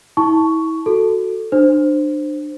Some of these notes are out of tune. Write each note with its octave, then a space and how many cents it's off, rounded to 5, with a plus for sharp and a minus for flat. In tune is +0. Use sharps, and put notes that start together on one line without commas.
E4 -35 A5 +0 C#6 +10
F#4 +0 A4 +0
D4 +30 C5 +0